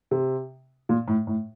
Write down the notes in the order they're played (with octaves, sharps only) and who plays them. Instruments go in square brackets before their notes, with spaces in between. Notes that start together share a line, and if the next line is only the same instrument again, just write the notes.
[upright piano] C3
A#2
A2
A2